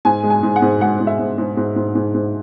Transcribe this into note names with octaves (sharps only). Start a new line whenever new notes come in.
G#2 G#5
G#3
G#5
G#2
F#5
G#2
G#3 F#5
G#2
E5
G#2
G#2
G#2
G#2
G#2
G#2